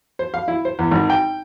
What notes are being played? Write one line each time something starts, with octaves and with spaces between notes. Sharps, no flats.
C5
F5
E4
C5
E2
G#1
G5